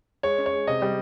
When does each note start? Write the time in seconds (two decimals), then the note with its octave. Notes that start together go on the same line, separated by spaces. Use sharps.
0.23 G#3 C#5
0.38 C#4
0.46 C#5
0.53 G#3
0.67 C3 D#5
0.82 G3